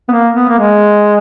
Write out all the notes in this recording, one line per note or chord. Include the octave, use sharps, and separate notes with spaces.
B3
A#3
B3
A#3
G#3